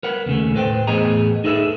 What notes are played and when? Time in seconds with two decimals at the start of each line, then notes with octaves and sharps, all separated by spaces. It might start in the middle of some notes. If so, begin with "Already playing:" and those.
0.03 A#4 B4 F#5
0.26 D#2 C#3 A3
0.55 A2 B4 C5 G5
0.87 E2 A2 B3 G#4 D#5 A#5
1.44 D#4 G#4 A4 B4 E5